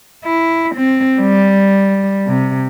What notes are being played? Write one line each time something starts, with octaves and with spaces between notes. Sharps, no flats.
E4
C4
G3
C3